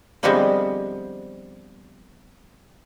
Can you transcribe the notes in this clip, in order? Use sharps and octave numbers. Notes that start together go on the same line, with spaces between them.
D3 F3 G3 G#3 B3 C4